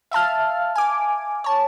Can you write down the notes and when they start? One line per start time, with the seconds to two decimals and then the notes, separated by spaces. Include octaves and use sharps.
0.11 E5 F5 A5 F6
0.75 G#5 D6
1.44 C#5 A5